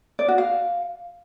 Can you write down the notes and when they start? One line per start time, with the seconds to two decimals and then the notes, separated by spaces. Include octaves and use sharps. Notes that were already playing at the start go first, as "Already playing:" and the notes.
0.19 D5
0.28 F#4
0.38 F5